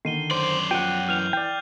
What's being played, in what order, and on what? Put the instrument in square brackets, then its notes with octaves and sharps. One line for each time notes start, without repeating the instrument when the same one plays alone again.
[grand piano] D3 D#3 [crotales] C7 D#7 G7
[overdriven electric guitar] F#2 D5 [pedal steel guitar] C5
[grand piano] F3 [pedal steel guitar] F#5 G5 [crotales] D#7
[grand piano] E3 [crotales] F6 G6 F7
[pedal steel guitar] D5 G5